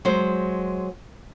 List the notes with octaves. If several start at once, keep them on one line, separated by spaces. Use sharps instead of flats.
F#3 G#3 C5